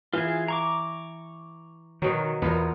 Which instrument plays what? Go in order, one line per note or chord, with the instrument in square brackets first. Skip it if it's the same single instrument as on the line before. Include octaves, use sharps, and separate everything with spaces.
[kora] E3 [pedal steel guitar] F4 G#4
[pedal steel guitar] A#5 C#6 D6
[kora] B2 F#3 [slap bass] D#3
[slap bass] E2 [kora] B3 F4 A#4